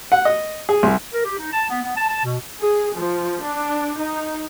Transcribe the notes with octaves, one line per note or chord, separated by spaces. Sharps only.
F#5
D#5
G#4
C2
A#4
G4
D#4
A5
B3
B3
A5
A5
B2
G#4
F3
D4
D#4